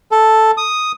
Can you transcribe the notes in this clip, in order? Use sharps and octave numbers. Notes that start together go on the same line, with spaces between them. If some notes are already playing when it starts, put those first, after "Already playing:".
A4
D#6